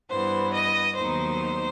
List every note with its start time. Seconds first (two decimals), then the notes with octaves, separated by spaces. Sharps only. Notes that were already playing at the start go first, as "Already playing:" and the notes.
0.10 G2 E3 B3 C5
0.54 D#5
0.97 D#2 D#3 F#3 B3 D#4 C5